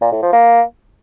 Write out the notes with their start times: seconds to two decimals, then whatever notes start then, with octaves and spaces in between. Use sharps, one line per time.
0.01 A#2
0.12 A2
0.22 F3
0.33 A#3